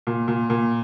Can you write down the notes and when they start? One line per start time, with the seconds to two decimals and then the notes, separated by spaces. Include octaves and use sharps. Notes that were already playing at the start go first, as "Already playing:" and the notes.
0.07 A#2
0.28 A#2
0.50 A#2